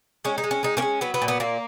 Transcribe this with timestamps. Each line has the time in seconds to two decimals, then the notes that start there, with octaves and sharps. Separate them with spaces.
0.25 G#3 C#4
0.38 D#4
0.44 G#3
0.51 C#4
0.63 G#3 D#4
0.77 A#3 C#4
0.82 G#3
1.01 F#3 B3
1.14 B3
1.22 A#2
1.28 B3
1.40 A#2 A#3